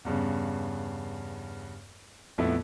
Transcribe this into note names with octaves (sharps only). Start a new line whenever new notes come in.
E2 G2 C#3
A#1 F2 A3 B3 E4